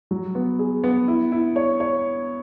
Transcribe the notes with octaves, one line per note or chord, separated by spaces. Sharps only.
F#3
B3
G#4
B3
E4
E4
C#5
C#5